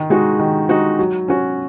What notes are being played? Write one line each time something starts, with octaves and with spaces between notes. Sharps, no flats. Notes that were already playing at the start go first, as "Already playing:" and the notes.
Already playing: D#3
G#3 D#4 F#4
D#3
G#3 D#4 F#4
F#3
C#4 F#4